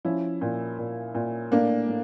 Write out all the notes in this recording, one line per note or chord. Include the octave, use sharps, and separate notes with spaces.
F3 C#4 E4
A#2
A#2
A#2
A2 A#3 D4
A2